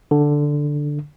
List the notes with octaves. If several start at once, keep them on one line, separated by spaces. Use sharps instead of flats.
D3